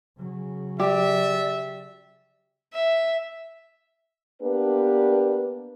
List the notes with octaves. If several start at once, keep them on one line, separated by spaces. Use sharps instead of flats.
C#3 F#3
G4 D5 E5
E5
A#3 B3 D4 G4 B4